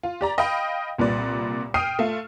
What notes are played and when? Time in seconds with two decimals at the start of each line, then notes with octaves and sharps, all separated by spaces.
0.03 F4
0.21 G4 D5 A#5
0.38 D#5 F5 G5 B5
0.99 C2 A#2 G3 B4 D5
1.74 G5 D#6 F6 C7 D#7
1.99 A3 F4